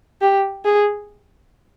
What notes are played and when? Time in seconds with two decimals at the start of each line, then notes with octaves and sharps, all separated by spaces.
0.21 G4
0.65 G#4